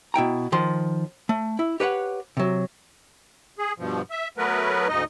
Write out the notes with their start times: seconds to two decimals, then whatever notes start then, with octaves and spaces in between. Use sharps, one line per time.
0.14 B2 E4 G5 A#5
0.52 D#3 F3 C6
1.29 A3
1.59 E4
1.80 G4 B4 C#5 F#5
2.37 C3 F#3
3.59 G#4
3.78 G2 B2 F3
4.11 E5
4.38 F#3 A3 B3 A#4 B4
4.89 D2 G#2 D#4 D#5